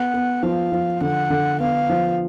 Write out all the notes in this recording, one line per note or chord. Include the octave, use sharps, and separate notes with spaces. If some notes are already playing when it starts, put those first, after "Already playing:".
Already playing: B3 F#5
B3
F3 F5
F3
D3 F#5
D3
B3 F5
F3